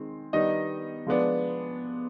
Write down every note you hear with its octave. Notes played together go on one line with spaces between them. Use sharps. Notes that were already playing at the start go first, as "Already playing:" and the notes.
Already playing: D#3 G#3 C4
D#3 G3 B3 D4 D#4 D#5
F3 G#3 B3 D4